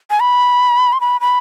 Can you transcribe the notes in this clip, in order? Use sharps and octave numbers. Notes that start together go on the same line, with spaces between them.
G#5
B5
C6
B5
B5